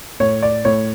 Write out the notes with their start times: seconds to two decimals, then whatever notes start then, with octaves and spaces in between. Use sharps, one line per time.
0.20 A2 C#5
0.43 D5
0.65 A2 C#5